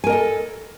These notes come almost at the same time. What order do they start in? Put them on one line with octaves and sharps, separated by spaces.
G#5 A#4 D#5 A4